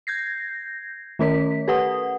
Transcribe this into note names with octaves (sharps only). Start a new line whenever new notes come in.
G6 G#6 A#6 C7
D#3 A3 C#4 A#4 C#5 B6
G4 A4 B4 F#5 D#6